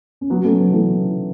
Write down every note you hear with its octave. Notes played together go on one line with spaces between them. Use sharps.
C#4
F#3 B3
A3 C#4
F#3 B3
E3 A3